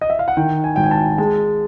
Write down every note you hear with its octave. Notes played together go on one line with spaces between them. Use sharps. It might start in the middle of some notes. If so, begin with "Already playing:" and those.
D#5
E5
F5
F#5
D#3 G5
G#5
G#1 G5
G#5
A5
G#3 A5